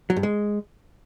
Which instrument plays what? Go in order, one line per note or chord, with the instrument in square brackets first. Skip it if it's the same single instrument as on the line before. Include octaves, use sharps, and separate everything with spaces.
[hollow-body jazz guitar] F#3
G2
G#3